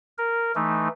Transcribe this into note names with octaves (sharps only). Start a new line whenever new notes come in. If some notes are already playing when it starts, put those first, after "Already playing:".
A#4
E3 A3 D#4